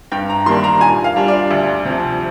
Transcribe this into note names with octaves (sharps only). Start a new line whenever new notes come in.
G2 G5
A#5
D#3 G3 A#3 D4 C6
A#5
A#2 G#5
F5
G3 D4 F4
D5
D2
C3 F3